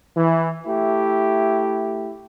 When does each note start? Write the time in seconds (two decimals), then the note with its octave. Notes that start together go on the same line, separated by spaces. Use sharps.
0.15 E3
0.65 A3 E4 G4